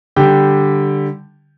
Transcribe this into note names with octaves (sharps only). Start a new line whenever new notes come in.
D3 G3 G4 G5